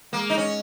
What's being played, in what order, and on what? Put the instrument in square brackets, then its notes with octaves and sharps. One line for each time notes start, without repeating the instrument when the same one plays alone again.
[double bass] G#3 [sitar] A#3
[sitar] D#4
C#4